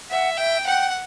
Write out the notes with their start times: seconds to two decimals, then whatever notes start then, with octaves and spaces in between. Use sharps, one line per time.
0.10 E5 F#5
0.37 E5 G5
0.66 F#5 G5